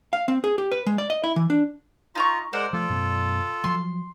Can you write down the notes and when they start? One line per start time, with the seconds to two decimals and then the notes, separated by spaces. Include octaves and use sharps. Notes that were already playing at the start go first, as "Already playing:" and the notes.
0.13 F5
0.28 C4
0.44 G#4
0.58 G4
0.72 B4
0.86 G#3
0.98 D5
1.10 D#5
1.24 E4
1.36 E3
1.50 D4
2.15 D#4 F4 A#5 C#6
2.53 G#3 A#4 C5 D5 F#5
2.73 F3 A3 F4 A4
2.89 F#2 B2
3.64 F3 F#3 C6